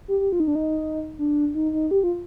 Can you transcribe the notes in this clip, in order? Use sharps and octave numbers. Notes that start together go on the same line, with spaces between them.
G4
G4
F4
D#4
D4
D#4
D4
D#4
D#4
G4
F4